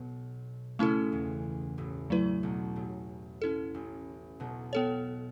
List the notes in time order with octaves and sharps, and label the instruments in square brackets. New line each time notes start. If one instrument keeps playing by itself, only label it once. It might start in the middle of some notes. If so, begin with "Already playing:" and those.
Already playing: [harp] B1 B2 [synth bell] B3
[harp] C#2 C#3 [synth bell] A3 C#4 E4 A4
[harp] E2 E3
A1 A2
[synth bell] F#3 A3 E4 B4
[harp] B1 B2
A1 A2
[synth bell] C#4 E4 A4
[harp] A1 A2
B1 B2
[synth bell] B3 A4 C#5